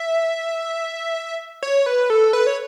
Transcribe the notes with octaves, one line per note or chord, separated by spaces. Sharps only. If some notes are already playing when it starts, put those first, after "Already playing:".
Already playing: E5
C#5
B4
A4
B4
C#5